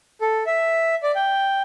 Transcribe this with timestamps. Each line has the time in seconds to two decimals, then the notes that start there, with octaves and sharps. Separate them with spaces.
0.21 A4
0.46 E5
1.03 D5
1.15 G5